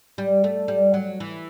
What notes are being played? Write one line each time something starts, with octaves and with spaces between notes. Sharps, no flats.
G3
A3
G3
F#3
E3